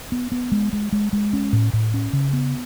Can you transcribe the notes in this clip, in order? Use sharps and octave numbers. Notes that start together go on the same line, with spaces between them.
B3
B3
G#3
G#3
G#3
G#3
C#4
A2
A2
C#4
C#3
B3